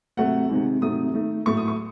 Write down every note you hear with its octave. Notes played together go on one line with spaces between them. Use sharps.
C3 F#3 A3 F#5
C3 D#3 G#3
C3 D#3 F#3 A3 D#6
D#3 A3
A2 F#3 A3 C#6
D#6
C#6